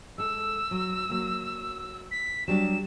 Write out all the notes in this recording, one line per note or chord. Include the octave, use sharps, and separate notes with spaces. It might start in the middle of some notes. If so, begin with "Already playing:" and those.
G#3 A4 E6
F#3
F#3 A#3
B6
F#3 G3 D4 E7